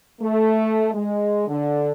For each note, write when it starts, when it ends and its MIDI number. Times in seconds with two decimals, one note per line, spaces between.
0.21 0.89 57
0.93 1.43 56
1.48 1.92 50